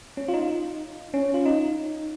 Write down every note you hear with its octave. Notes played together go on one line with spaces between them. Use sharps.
C#4
F4
D#4
C#4
F4
D#4